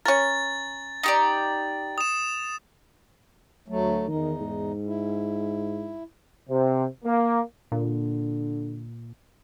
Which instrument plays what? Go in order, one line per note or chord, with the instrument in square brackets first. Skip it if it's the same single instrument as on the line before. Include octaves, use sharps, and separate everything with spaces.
[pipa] C#4 A#4 [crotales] A6
[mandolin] D#4 G4 D5
[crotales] D#6 E7
[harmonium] D2 F#3 A3
[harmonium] E2 D#4 [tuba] D#3
[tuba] G#2
[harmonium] E4
[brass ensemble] C3
A#3
[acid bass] A#2 [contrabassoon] D3